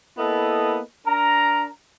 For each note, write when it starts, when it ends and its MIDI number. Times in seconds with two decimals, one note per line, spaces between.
0.17 0.79 58
0.17 0.79 59
0.17 0.79 64
0.17 0.79 69
0.17 0.79 75
1.06 1.67 62
1.06 1.67 70
1.06 1.67 82